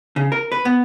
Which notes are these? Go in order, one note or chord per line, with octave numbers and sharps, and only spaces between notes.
C#3
A#4
B4
B3